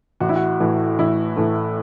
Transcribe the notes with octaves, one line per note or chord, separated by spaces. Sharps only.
A1 F#4
E4
F#4
A2 E3 A3
A1 E4
A2 E3 A3